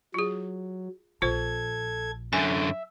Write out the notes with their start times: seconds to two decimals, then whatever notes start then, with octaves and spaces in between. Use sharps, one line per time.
0.14 F#3 F4 G#4
1.22 A#1 F4 A4 C5 G#6
2.33 F#2 D3 E5 G#5